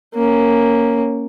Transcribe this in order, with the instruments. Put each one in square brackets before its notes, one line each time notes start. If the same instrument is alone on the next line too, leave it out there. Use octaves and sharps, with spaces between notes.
[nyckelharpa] A#3 C#4